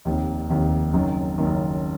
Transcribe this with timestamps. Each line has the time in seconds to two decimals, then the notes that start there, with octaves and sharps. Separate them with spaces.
0.05 F1 D#2 D#3
0.49 F1 D#2 D#3
0.93 F#1 F#2 D#3
1.38 F#1 F#2 D#3